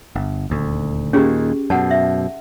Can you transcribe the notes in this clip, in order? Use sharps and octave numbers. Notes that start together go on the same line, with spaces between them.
G1
D#1 D2
D#2 A#2 C#4 G4 G#4
F#2 B2 F#5 A5
E5